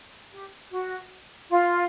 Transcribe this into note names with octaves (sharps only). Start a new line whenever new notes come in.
G4
F#4
F4